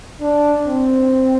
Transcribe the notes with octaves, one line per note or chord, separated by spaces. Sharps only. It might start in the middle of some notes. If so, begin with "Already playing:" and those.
D4
C4